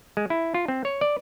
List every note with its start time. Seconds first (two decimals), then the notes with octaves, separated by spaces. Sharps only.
0.17 G#3
0.30 E4
0.54 F4
0.68 C4
0.85 C#5
1.01 D5